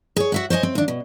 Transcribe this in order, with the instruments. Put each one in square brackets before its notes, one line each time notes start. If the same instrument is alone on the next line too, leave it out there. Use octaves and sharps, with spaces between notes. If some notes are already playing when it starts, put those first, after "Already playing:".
[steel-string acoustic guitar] G#4 C#5
F#4 E5 F#5
C5 C#5 D#5 G#5
C4
D#2 D4
B2